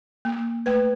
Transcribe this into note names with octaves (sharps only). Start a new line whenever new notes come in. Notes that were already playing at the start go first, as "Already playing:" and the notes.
A#3
A3 B4